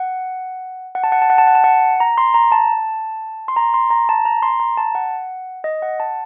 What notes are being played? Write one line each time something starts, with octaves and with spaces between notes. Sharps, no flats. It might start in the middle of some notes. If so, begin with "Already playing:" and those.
Already playing: F#5
F#5
A5
F#5
A5
F#5
A5
F#5
A5
F#5
A#5
C6
A#5
A5
C6
A#5
C6
A#5
A5
A#5
C6
A#5
A5
F#5
D#5
F#5
A5